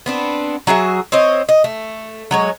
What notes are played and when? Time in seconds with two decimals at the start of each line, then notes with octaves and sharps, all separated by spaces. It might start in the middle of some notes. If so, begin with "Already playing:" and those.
0.06 B3 C4 D4
0.67 F#3 F#4 G#4 E5
1.12 C4 C5 C#5 D#5
1.49 D#5
1.64 A3
2.31 F#3 G#3 C#5